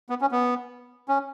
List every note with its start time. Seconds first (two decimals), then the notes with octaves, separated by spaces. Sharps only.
0.10 B3
0.21 C#4
0.31 B3
1.09 C#4